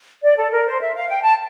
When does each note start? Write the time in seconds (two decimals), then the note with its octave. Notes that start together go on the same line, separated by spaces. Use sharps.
0.23 D5
0.37 A4
0.52 A#4
0.66 C5
0.80 E5
0.95 F5
1.08 G5
1.24 A5